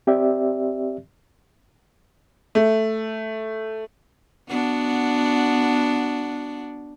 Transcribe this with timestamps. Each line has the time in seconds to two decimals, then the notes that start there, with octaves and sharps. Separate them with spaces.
0.07 C4 G4 D5 E5
2.55 A3
4.49 B3 D4 F#4